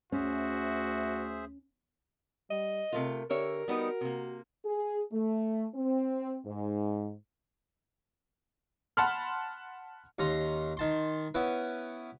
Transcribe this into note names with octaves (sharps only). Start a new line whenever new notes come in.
D2 C#4 F#4 G#4 C5 E5
G3 D#5
C3 A3 F4 A#4
D3 G4 A#4 C#5 E5
G3 B3 D#4 F#4
C3 A#3
G#4
A3
C4
G#2
F#5 A5 B5 C6 F6
D#2 C#4 A#5 C6
D#3 A5 C6
B3 C#4 E4 B4